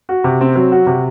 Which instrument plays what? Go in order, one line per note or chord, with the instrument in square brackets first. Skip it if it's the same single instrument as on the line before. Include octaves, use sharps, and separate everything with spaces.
[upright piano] F#4
C3
C4
F#3
F#4
C3